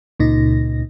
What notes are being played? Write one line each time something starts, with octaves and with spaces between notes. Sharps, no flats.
C#2 A#2 D#4 A#6